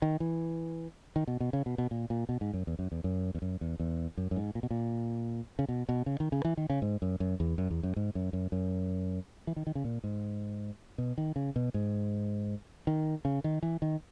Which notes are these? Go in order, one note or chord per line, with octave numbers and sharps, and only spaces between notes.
D#3
E3
D#3
B2
B2
C#3
B2
B2
A#2
A#2
B2
G#2
F#2
E2
F#2
E2
F#2
E2
F#2
E2
E2
F#2
F#2
G#2
A#2
B2
A#2
C#3
B2
B2
C#3
D#3
C#3
E3
D#3
C#3
G#2
F#2
F#2
E2
F#2
E2
F#2
G#2
F#2
F#2
F#2
E3
D#3
D#3
C#3
A#2
G#2
B2
D#3
C#3
B2
G#2
D#3
C#3
D#3
E3
D#3